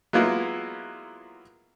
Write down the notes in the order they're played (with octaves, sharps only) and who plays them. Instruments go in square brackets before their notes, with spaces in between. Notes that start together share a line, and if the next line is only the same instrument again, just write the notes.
[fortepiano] F#3 G#3 A#3 B3 E4 F4